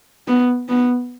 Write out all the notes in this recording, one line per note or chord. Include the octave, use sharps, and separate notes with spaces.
B3
B3